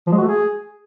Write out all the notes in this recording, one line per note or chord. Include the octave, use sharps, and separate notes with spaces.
F3
G#3
F#4
A3
G#4